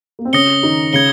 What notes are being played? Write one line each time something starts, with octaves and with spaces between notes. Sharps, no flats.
A#3
C4
C#3 C#4 D#6 A#6 C#7 G7
D#3 D#4
C#3 C#4 G#6 C#7 G7